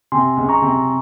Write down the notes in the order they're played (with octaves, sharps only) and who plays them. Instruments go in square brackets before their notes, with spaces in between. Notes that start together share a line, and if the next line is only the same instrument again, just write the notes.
[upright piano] C3 [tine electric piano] G#5 C6
[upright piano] C#2
[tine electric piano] A#5 C#6
[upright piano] C3